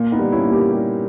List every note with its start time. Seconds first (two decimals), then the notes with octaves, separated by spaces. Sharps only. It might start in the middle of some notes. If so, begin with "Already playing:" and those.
Already playing: A#2
0.12 B3 D#4
0.19 G3
0.32 C#4 E4
0.45 A#2
0.52 G4 A#4
0.72 G3